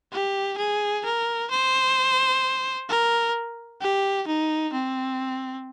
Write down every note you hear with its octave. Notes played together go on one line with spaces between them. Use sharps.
G4
G#4
A#4
C5
A#4
G4
D#4
C4